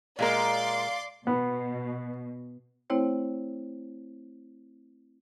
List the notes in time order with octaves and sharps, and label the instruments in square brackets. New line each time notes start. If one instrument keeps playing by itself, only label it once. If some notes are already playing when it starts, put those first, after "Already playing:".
[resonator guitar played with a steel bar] A#2 G#3 A#4 [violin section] D5 C6 D6 [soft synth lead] F5
[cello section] B2 [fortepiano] B3
[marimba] A3 C4 E4 C5 C#5 G5